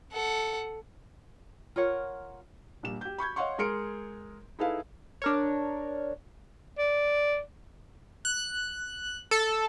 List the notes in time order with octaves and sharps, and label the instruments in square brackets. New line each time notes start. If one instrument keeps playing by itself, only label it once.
[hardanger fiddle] A4 F#5
[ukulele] F4 A#4 C#5 F#5
[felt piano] A#1 G3 E7
G4 G6
B5 C#6 G6 G#6
C#5 D#5 F5 F#5 C6 C#6
G#3 G#4 A#4 C6 C#7 D7
D#4 E4 G#4 A4 B4 F5
[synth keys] D4 A#4 C#5
[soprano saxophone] D5
[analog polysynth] F#6
A4